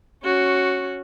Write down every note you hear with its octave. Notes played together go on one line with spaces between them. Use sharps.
C#4 F#4